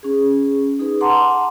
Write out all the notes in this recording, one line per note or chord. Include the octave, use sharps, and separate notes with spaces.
C#4 G#4
D#4 G#4 B4
F#5 A5 A#5 C6 D6